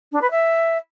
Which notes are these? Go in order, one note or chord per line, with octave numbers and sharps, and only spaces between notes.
D4
B4
E5